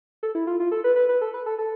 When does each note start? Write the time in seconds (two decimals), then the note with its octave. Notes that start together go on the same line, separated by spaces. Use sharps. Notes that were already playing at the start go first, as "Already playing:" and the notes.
0.23 A4
0.35 E4
0.47 F4
0.60 F4
0.72 A4
0.84 B4
0.96 B4
1.09 B4
1.21 A4
1.34 B4
1.46 A4
1.58 A4